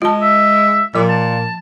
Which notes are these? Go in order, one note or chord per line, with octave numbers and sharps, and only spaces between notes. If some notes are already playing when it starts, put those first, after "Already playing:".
G#3 F4 A5
E5
A#2 F3 D6
A5